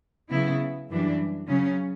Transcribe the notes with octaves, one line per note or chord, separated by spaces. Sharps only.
C#3 F#3 B3 E4
F#2 E3 G3 D4
C#3 F#3 C#4